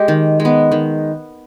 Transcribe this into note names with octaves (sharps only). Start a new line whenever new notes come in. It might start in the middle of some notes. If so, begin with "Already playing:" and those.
Already playing: G#3 G4
D#3
G#3
B3
D#3